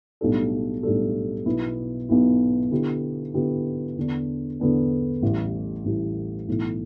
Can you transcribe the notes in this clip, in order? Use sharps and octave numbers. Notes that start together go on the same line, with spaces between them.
B1 A2 G3 D4 A4
B1 A2 G3 D4 A4
B1 B2 B3 E4
B1 B2 B3 E4
D3 B3 E4 G4
D3 B3 E4 G4
E2 D3 B3 D4
E2 D3 B3 D4
A1 A2 E3 G3
A1 A2 E3 G3
B1 A2 E3